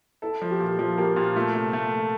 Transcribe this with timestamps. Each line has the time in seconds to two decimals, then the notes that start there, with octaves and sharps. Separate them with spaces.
0.22 E4 A4
0.41 F3
0.51 G4
0.60 A#2
0.79 F3 F4
0.98 A#3 G4
1.16 A#2 F4
1.36 A3 F4
1.55 C3
1.73 A3